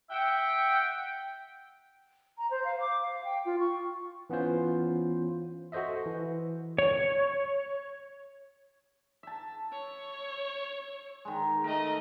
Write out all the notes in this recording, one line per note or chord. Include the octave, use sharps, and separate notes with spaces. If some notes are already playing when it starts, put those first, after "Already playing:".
E5 F#5 G5
A#5
C5
F5
D6
F5
G5
F4
C#6
E3 B3 C#4 F4 C5
F#4 A4 C5 D#5 E5
E3
C#5
E5 A5
C#5
D#3 G#3
A3 A#4 D#5